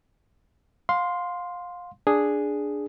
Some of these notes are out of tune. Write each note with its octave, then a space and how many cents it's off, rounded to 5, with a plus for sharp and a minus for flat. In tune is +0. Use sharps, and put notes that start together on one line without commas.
F5 +25 C6 +0
D4 +0 G#4 +0